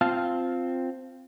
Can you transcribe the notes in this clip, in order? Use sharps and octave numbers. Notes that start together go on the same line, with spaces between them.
C4 F4 F5 A5 F6